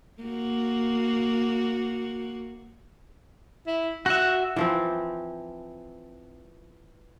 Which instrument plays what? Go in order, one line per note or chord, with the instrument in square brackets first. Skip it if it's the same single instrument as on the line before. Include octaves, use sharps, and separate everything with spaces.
[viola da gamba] A#3 F#4
[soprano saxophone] E4
[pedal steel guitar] F#4 E5 [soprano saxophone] F#5
[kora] E3 F3 C4